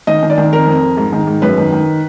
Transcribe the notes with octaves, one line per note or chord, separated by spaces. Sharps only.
D#3 D#5
D#3
D5
D#3
F2 A#4
F2
F2
G#2
D#3
G#2
F#2 B4
D#3
D#3